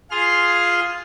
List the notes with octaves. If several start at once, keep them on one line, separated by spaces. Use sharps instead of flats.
F4 G#4 C6 F6